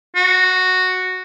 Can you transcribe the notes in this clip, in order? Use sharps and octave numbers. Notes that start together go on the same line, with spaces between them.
F#4